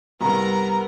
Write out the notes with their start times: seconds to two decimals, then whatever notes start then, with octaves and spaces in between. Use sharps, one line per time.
0.21 C2 G2 B3 A#4 A#5